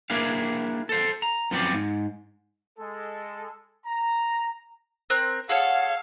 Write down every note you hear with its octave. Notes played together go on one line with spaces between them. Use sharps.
A#3 D4 E4 G#4 F5
A4 C5
A#5
F#2 F3 B3 C4 D5
G#2
G#3 A4
A#5
C4 A#4 F#6
G#4 A4 C#5 F5 F#5